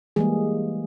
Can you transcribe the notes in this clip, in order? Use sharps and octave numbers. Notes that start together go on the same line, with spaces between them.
E3 G3 G#3 A#3 G#4